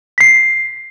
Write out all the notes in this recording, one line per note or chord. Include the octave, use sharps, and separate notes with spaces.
B6 C7